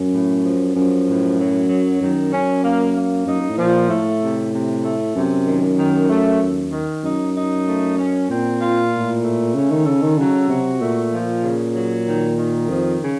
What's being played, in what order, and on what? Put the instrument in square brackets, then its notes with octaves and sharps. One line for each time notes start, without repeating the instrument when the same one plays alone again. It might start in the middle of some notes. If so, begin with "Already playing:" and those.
Already playing: [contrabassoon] F#2
[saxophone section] A2
F3
[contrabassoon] F#2 [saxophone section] F3
[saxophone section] A2
F#3
F#3
[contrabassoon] F#2 [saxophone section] D#3
[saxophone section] C#4
A#3
A#3
[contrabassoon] F#2 [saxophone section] D#4
[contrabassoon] F#2
A2
[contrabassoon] A#2 [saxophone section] F3
[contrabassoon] A2 [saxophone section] A3
[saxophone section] C3
C3
A3
[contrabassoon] F#2 [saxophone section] C3
[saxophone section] D#3
D#3
A3
D#2
D#3
[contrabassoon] F#2 [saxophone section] D#4
[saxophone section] D#4
A3
C#4
[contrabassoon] A#2 [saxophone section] C4
[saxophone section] F4
A2
A3
[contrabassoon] C#3 [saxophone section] C#4
[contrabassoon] D#3
[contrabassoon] C#3 [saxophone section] A4
[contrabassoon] D#3
[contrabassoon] C#3 [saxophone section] F#3
[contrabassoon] C3 [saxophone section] F#4
[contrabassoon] A#2 [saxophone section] A3
[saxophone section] F3
C#3
F#3
D#3
D#3
[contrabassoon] F2 [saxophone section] F3
[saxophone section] C#3